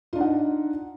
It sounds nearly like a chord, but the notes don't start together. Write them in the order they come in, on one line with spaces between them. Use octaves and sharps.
F4 D4 D#4 F#5